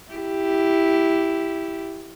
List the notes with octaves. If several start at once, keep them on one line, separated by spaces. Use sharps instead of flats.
E4 G4